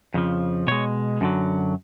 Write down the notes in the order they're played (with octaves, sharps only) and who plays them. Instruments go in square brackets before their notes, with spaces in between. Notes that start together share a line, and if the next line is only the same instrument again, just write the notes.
[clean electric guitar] F2 C#3 F3
B2 G#3 C#5
F#2 D3 F#3